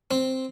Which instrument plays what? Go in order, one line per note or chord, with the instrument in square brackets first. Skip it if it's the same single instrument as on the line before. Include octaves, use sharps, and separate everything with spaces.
[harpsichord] C4